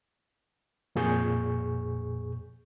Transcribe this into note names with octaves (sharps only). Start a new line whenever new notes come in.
F2 A#2 G#4 C#6 G6